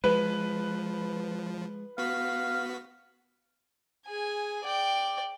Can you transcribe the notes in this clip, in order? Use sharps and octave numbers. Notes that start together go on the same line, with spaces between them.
F3 G#3 B4
B3 F#4 F5 B6
G#4 G#5
D5 G5